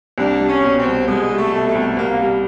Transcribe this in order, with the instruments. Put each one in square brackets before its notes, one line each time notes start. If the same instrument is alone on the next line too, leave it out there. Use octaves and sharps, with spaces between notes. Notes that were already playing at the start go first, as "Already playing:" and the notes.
[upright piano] C2 [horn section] D4
[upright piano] G3
[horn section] C#4
[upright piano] B2
[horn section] C4
[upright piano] C2
[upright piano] C2 [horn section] G#3
[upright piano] G3
[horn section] A3
[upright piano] B2
[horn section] A3
[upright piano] C2
[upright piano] C2 [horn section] A#3
[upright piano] G3